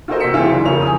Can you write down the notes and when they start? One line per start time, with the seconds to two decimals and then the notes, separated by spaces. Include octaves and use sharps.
0.08 F4 F#4 A4 A#4 C5 D#5
0.20 C3 A#3 E6 B6 C#7 E7
0.32 F#1 E3 F4 G#4 G5
0.50 C#3 E3 F#3 D4
0.65 F1 C#3 F3 A#4 C#5 F7
0.81 G#5 D#6